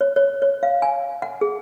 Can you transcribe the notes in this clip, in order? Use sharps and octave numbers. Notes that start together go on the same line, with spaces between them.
C#5
C#5
C#5
F5
G#5
F#5
G#4